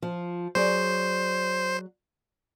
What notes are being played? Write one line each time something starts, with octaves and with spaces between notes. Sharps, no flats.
F3
F#3 G#4 C5 D5